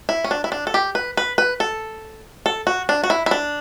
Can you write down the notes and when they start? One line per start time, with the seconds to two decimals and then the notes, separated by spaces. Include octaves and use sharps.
0.09 E4
0.24 C#4
0.31 D4
0.44 E4
0.52 D4
0.67 A4
0.74 G4
0.95 B4
1.17 B4
1.38 B4
1.60 A4
2.46 A4
2.67 F#4
2.89 D4
3.04 F#4
3.10 E4
3.26 E4
3.31 D4